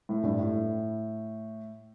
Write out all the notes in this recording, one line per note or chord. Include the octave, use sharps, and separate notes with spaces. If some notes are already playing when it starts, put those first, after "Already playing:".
A2
G2
A2